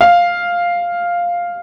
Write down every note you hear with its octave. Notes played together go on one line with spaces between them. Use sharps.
F5